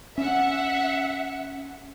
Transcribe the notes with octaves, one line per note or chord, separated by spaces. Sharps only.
C#4 E5 F#5